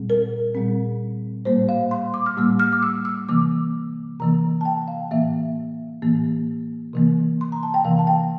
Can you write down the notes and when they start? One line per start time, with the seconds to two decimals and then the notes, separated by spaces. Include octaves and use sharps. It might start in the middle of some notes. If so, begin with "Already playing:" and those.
Already playing: A#2 G3 C4
0.10 A#4
0.55 A#2 G3 C4
1.45 A2 G3 A#3 C5
1.69 F5
1.91 C6
2.14 D6
2.26 F6
2.37 A2 G3 A#3 E6
2.60 F6
2.73 D6
2.83 E6
3.05 E6
3.29 C3 E3 A#3 D6
4.20 C3 E3 A#3 A#5
4.61 A5
4.65 G5
4.88 F5
5.11 A2 E3 A#3 E5
6.02 A2 E3 A#3
6.93 C3 E3 A#3
7.41 C6
7.52 A#5
7.63 A5
7.74 G5
7.85 C3 E3 A#3 F5
7.99 A5
8.07 G5